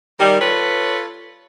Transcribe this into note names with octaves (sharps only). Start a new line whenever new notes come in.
D#3 G3
F4 A4 B4 C#5